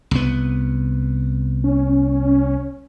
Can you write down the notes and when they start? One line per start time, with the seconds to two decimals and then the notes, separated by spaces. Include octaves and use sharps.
0.11 C2 B3
1.64 C#4